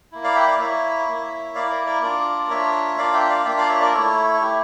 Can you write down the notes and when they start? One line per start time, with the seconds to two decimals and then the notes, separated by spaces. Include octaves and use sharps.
0.12 A#3 E4
0.24 D5 F5
0.36 E5 G5
0.48 D5 F5
0.60 A#3 E4 C#5 E5
1.07 A#3 E4
1.55 A#3 E4 D5 F5
1.71 A#4 D5
1.86 A#4 D5
2.03 A#3 D4 F4 A#4 D5
2.50 A#3 D4 F4 C#5 E5
2.98 A#3 D4 F4 D5 F5
3.13 E5 G5
3.30 D5 F5
3.45 A#3 D4 F4 E5 G5
3.58 D5 F5
3.69 C#5 E5
3.81 A#4 D5
3.93 A3 E4 A4 C#5
4.41 A3 E4 G4